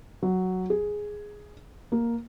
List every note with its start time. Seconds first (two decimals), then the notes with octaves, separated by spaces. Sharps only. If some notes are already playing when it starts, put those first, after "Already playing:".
0.22 F#3
0.70 G#4
1.92 A#3